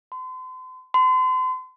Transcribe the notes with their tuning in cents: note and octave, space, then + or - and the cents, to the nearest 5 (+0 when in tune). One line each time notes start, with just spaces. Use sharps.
C6 -40
C6 -40